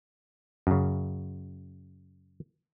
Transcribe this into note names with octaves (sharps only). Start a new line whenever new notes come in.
F#2 C#3